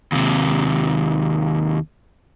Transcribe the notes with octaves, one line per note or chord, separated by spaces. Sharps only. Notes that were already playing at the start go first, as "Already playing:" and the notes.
D#2 C3